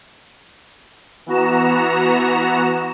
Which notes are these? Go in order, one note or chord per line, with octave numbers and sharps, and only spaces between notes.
E3 B3 F#4 A#5 E7